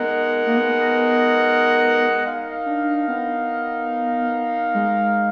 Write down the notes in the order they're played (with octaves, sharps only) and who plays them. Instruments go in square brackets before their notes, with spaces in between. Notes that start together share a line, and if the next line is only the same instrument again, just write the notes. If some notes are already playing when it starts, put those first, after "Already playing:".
Already playing: [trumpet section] G#3 D#4 A#4 D#5 F#5 [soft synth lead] B3
[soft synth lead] A#3
B3
[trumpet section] D#4 A#4 F5
[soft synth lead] D4
B3
G#3